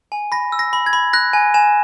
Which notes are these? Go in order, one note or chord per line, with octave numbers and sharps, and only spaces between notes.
G#5
B5 A#6
E6
A#6
B5
G#6
B5
F#6 A#6
G#5
G#5 E7